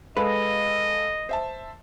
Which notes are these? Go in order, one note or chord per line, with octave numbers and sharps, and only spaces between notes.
G#3 A4 B4 D#5 F5
C5 E5 A5